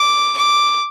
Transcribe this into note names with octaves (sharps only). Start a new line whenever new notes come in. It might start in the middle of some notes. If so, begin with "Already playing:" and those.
Already playing: D6
D6